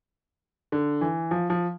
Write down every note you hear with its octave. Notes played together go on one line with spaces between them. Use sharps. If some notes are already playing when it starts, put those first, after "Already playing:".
D3
E3
F3
F3